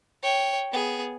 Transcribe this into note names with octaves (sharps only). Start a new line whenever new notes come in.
C#5 G5
B3 G#4